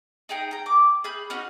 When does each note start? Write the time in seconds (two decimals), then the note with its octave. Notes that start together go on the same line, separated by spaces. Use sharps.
0.29 D#4 G#4 G5 A#5
0.51 G5 A#5
0.66 D6
1.04 G#4 B5 G6
1.30 C#4 D#4 F#4